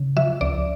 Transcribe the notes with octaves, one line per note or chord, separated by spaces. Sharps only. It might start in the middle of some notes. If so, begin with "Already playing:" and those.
Already playing: C#3
F3 E5
C#2 D5